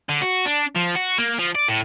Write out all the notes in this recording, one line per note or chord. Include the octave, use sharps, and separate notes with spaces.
D3
F#4
D4
F3
F#4
A#3
F3
D5
A2